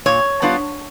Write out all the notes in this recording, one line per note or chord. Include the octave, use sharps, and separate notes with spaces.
A#2 C#5
G3 B3 D4 F4